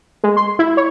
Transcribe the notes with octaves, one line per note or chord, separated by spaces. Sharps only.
G#3
C6
E4
C#5